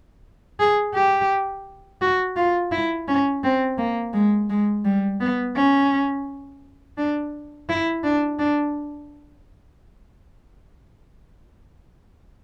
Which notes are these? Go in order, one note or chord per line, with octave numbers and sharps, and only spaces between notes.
G#4
G4
F#4
F4
E4
C#4
C4
A#3
G#3
G#3
G3
B3
C#4
D4
E4
D4
D4